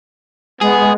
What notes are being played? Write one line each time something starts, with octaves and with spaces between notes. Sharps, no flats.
G#3 B3 G#4